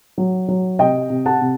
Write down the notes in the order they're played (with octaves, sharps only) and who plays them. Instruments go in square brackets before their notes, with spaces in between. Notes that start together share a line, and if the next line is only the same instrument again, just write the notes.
[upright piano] F#3
F#3
C3 D#5 G5
C3
F#5 A5
C3